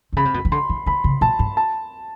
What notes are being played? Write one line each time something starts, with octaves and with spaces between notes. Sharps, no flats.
D3
C#3 B5
C3
B2
D#3
D3 C6
D#3
D#3 B5
C#3
A#2 A5
G#2
A5